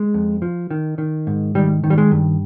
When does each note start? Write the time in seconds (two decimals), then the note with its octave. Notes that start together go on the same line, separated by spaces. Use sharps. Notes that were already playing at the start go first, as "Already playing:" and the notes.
Already playing: G#3
0.14 F2
0.42 F3
0.71 D#3
0.98 D#3
1.27 G#2
1.55 D#3 G3
1.84 D#3
1.90 G3
1.98 G#3
2.11 G2